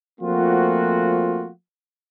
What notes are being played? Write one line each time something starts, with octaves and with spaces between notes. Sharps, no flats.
F3 A3 A#3 C4 F4 F#4